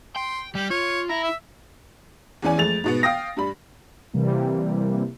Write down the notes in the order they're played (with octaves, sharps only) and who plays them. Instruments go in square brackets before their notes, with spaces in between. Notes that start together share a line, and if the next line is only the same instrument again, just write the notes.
[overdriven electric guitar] G5 [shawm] C6
[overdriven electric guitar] G3 [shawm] G4
[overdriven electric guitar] F4 [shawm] C#5
[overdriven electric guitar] E4 [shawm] A#5
[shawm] E5
[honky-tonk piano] E2 E3 C#4 D5 G#5
F2 G#3 A3 A6 F7
G#2 B2 B3
F5 G5 D#6 A#6
G2 G3 B5
[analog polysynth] C3 E3 G3 A#3